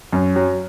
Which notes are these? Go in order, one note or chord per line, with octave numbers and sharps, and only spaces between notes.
F#2
F#3